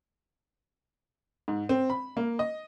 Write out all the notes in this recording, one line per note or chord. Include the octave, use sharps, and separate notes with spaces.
G#2
C4
B5
A#3
D#5